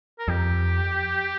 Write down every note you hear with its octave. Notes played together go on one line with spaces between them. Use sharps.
A#4
F2 G4